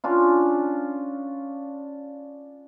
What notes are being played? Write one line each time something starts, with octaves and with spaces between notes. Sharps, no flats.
C#4 D4 F4